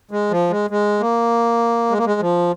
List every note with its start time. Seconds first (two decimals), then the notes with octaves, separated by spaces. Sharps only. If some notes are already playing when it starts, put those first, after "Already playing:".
0.11 G#3
0.31 F3
0.50 G#3
0.70 G#3
1.00 A#3
1.91 G#3
1.98 A#3
2.05 G#3
2.20 F3